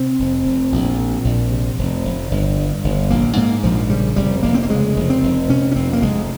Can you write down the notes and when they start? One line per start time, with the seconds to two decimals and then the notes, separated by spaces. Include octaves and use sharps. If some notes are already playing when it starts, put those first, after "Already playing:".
Already playing: C3 C4
0.19 F1
0.45 F1
0.72 A#1
0.98 A#2
1.25 A#1
1.51 C3
1.78 F1
2.04 F1
2.31 G1
2.57 G2
2.84 G1
3.10 A#1 A#3
3.37 G#2 A#3
3.63 A#1 F3
3.90 C#3 G3
4.16 F1 G3
4.43 F1 A#3
4.55 C4
4.63 A#3
4.69 C#3 G#3
4.96 F1
5.10 C4
5.23 F1
5.49 C3 C#4
5.72 C#4
5.75 F1 C4
5.93 A#3
6.02 F1 G#3